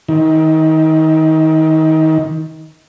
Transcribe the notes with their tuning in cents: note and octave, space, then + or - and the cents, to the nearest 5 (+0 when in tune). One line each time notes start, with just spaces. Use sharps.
D#3 +25